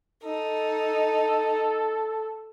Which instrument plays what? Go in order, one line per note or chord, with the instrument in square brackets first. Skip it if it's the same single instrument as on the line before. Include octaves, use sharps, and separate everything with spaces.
[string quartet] D#4 [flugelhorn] A4